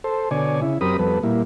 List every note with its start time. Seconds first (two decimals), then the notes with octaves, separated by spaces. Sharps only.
0.04 A4 C5
0.31 B2 D3 C#5 D5 G#5
0.62 C#3 E4
0.81 F#2 C4 G4 A#4 B5 D#6
0.99 F2 G3 B3 A4 B4
1.23 A#2 G3 A#3 E4